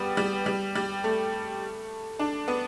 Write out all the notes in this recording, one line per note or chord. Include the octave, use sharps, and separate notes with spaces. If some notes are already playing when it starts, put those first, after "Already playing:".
Already playing: G3 B3
G3
G3
G3
A3
D4
B3